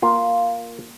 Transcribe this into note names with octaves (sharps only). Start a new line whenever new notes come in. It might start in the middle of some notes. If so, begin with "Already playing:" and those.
A#3 F4